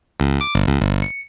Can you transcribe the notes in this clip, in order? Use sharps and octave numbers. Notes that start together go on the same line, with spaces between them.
C#2
D6
G1
C#2
G1
C#7